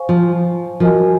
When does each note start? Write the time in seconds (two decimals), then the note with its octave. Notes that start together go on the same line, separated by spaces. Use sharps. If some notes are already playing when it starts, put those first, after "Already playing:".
Already playing: C5 F5 G#5 C#6
0.09 F3
0.80 F3 F#4 A#4 D#5 G#5